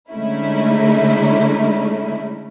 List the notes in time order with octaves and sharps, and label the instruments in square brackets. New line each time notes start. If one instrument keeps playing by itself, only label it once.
[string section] D3 G#3 A3 C#4 D#4 E4